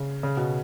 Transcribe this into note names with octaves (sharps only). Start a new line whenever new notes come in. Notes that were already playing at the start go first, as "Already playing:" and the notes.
Already playing: C#3
C#3
B2